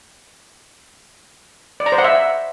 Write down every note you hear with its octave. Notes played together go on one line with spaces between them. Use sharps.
D5
A#5
C5
F#5
E5